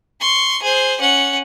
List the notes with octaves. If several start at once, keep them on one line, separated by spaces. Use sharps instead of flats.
C6 C#6
G#4 C5
C#4 F#5